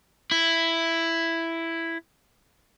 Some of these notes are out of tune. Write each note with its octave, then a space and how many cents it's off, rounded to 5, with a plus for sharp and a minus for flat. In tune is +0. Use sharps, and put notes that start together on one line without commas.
E4 +5